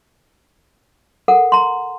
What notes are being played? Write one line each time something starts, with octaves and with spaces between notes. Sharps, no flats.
A4 A#4 F#5
A#5 C6